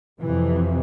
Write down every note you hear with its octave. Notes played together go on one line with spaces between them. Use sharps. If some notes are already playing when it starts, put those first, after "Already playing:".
F2 C3 E3